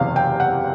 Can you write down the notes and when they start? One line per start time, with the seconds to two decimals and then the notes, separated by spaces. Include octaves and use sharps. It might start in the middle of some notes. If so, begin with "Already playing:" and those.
Already playing: F#1 E2 C3 F5
0.16 G5
0.40 F#5